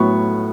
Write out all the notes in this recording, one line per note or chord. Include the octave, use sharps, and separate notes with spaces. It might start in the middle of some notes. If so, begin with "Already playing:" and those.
Already playing: A2 F#3 B3 C#6